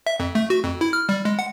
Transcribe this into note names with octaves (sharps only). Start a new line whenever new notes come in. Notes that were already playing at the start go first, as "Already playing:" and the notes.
E5
F2
A3
F#4
F2
E4
F6
G3
G#3
F#5